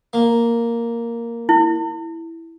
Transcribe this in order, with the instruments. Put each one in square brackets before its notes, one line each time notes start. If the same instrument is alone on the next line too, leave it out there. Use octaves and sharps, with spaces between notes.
[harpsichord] A#3
[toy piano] E4